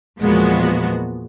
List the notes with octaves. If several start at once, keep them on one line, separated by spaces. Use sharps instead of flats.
E2 A#2 F3 G#3 B3 F#4